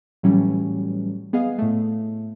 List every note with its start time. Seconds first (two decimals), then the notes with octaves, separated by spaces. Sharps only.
0.23 A2 E3 F#3 G3 C#4
1.33 B3 G#4 D#5 F5
1.58 A2 A3